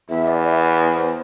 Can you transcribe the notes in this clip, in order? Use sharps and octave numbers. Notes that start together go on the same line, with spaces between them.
E2 E5
D5
E5
C5